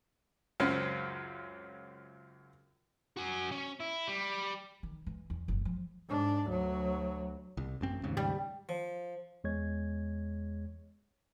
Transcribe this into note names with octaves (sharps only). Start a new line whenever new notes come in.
C#2 F#2 C4 C#4 F6
F#4 G#5
C#4
E4
G3
D#3
E3
E2
F#1
F3
G#2 D4
D2 F#3
C2
A1 F#2 C4
D#2 G#2 C#3
G3
F3
E2 G#3 C#5 G#6